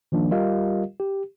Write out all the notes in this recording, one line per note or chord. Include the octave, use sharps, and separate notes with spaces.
D#3 F3 A#3 D4
G3 F4 G4 A#4 D#5 F5
G4